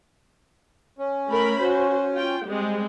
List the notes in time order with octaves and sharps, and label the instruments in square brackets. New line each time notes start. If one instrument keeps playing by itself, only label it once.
[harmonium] C#4
[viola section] A3 A#4 B5
F#4 C5
F4 G5
G3 G#3 C4